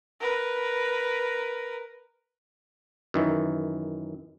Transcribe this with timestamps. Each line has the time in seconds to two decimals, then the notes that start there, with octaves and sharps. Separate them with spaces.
0.21 A#4 B4
3.14 F#2 D#3 E3